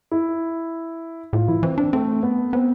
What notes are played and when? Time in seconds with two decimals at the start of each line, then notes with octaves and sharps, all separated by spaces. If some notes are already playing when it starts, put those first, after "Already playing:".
0.11 E4
1.33 A2 F4
1.48 E3 E4
1.63 E3 C4
1.78 C4 D4
1.93 A3 C4
2.23 B3
2.53 B3 C4